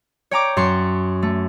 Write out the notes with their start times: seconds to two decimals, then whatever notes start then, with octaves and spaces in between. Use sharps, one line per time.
0.31 C#5 G5 A#5 D6
0.57 F#2 C6 C#6
1.23 A3